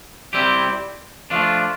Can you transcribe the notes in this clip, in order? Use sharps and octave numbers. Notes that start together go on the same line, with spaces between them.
G3 C4 E4 G4
F3 A3 D4 F4